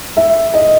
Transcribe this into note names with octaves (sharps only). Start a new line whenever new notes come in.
E5
D#5